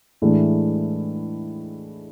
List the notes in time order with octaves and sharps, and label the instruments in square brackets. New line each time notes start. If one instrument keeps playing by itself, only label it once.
[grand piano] A2 E3 G#3 D4